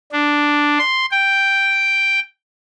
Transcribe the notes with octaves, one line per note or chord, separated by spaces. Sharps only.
D4
C6
G5